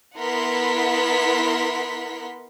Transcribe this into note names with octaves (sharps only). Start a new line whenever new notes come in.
B3 E4 A#4 F#5 C6 B6